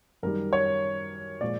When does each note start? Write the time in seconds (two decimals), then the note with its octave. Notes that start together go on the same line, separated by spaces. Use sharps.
0.23 F#2 D#3 G3 A#4
0.53 C#5
1.41 A#2 F3 G#3 D5